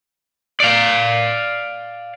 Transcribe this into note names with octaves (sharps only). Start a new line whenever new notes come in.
D5 F5